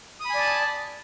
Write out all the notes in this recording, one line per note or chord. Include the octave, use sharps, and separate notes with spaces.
D5 G#5 A5 B5 D#6